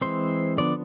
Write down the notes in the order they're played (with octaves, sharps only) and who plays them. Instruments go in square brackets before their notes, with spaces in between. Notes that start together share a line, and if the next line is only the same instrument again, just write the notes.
[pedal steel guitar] E3 G#3 C4 C5
D3 F3 B3 D4 D5